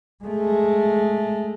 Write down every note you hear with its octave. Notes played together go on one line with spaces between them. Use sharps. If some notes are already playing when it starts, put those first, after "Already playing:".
G#3 A3